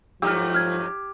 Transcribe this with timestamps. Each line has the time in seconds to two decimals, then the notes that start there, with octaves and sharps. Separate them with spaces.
0.22 G2 F3 F#3 A3 G4 E6 F6
0.54 F6 G#6